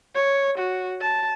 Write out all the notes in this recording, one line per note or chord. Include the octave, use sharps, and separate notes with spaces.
C#5
F#4
A5